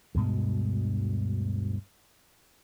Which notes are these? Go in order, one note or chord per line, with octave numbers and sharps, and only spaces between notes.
D2 G2 B2 G#3